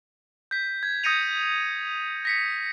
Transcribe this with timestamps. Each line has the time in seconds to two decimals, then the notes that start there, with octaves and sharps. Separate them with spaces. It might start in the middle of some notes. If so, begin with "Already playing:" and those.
0.51 G6 B6
0.83 G#6
1.04 D#6 G6 A#6 C#7 D#7 F7
2.25 A#6 B6 C#7